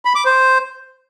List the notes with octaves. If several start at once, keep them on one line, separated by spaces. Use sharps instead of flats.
B5
D6
C5